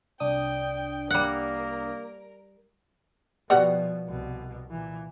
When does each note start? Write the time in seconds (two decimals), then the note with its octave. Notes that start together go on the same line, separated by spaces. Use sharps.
0.20 C2 D4 G5 D#6
1.11 G3 A#3 A#4 F#5
3.50 B2 F3 G3 B3 F#4
4.06 C2 B2
4.71 A#2 E3